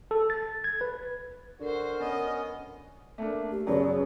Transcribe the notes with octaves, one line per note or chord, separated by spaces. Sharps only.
A4
A6
G#6
B4
D3 F#4 A#4 C5
B3 C#4 D#5
A3 A#3 D4
G4
F#2 C#3 F#3 B3 D5